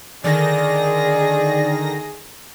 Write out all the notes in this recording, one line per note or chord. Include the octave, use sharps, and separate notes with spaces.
D3 D#3 G#4 D5 A#6